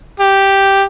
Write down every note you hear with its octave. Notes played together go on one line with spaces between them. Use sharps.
G4